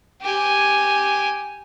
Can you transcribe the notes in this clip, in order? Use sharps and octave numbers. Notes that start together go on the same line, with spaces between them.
G4 G#5